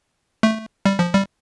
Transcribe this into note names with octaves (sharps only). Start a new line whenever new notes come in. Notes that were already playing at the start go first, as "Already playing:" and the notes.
A3
G3
F3
G3